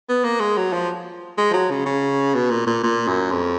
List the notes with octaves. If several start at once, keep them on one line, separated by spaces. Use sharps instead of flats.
B3
A#3
G#3
F#3
F3
G#3
F3
F#3
C#3
C#3
B2
A#2
A#2
A#2
F#2
F2